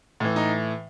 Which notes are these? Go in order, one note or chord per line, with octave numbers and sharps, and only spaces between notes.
A2 E3
D#4